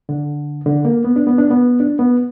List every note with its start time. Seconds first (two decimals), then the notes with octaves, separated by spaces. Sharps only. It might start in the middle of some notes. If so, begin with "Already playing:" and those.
0.09 D3
0.66 D3
0.85 A#3
1.04 B3
1.16 D4
1.27 B3
1.38 D4
1.50 B3
1.80 D4
1.99 B3